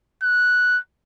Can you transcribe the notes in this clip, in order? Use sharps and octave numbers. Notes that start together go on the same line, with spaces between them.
F#6